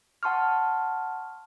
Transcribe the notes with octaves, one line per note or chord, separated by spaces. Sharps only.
F#5 A5 C6 C#6 F6